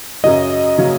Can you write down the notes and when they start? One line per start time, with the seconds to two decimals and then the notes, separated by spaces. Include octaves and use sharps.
0.24 F#2 C#3 F#3 C#4 D#5
0.78 C#3 F#3 C#4